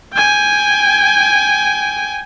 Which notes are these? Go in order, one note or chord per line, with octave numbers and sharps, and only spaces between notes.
G5 G#5